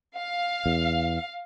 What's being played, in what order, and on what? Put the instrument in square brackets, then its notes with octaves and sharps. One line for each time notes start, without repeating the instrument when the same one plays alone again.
[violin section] F5
[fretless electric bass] E2